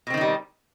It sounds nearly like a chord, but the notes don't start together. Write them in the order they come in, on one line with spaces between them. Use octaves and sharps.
B2 C4 D#3 D#4 G3